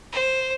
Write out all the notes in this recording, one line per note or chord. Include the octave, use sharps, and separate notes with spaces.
C5